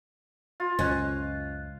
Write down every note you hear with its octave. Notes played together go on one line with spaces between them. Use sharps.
F4
C#2 F#2 C#4 D#5 F#6